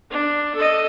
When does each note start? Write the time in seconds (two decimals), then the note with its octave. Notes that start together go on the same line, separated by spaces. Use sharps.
0.11 D4
0.55 A4 D#5